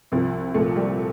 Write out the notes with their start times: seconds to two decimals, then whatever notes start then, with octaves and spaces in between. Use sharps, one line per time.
0.12 C2 C3 F3
0.54 C2 A#2 F3 A3
0.76 G3